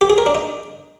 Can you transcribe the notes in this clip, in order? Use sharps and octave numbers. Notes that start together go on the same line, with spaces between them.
G4
G#4
A#4
D4
D#4